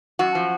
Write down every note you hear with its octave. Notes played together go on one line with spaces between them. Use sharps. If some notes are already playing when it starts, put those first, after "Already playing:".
F#2 F#4
F3